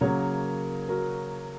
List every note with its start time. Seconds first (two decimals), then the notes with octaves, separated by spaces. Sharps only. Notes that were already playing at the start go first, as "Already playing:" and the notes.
0.01 C#3 F#3 A#3 A#4 C#5
0.89 F#4 A#4